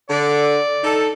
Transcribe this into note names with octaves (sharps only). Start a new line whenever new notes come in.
D3 D5
D#4 A4